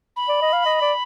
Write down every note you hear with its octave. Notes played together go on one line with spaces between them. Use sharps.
B5
D5
D#5
F5
D#5
D5